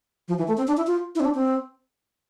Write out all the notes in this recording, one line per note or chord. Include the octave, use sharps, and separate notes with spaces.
F3
E3
A3
C4
D4
E4
F4
E4
C4
D4
C4